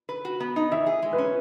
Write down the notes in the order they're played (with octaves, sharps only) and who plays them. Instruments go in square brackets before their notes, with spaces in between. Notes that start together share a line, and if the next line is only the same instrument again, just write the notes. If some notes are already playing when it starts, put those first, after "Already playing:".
[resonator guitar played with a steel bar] B4
F#4
B3
D#4
[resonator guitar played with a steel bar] E3 [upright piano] E5
[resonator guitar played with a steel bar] G#4
G#3
[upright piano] B4
[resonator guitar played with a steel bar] C#4